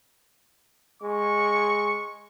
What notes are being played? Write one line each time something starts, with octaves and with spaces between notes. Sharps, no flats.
G#3 C#6